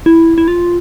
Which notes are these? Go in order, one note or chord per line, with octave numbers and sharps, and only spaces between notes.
E4
E4
F4